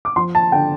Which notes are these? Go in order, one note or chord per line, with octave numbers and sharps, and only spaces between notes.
D6
F3 C6
A5
D3 G5